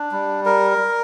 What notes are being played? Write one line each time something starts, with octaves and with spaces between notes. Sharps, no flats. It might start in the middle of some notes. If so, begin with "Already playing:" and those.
Already playing: D4
G3
A#4